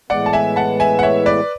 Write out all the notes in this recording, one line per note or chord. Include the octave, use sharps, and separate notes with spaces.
A2 E3 G#3 B3 D5 F#5
A5
E5 G#5
F#5 A5
E5 G#5
F#5
C#5 E5
B4 D5